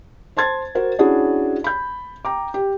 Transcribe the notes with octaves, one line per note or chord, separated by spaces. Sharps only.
C5 A5 C6 G#6 A6
F#4 A#4 C5 F#5
C#4 D4 E4 F#4 G#4
B5 G6
G5 A#5 D6
G4